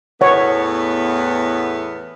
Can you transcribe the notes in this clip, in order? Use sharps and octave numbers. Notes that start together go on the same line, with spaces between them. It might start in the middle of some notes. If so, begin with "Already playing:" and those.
E2 A2 B3 C#5 F#5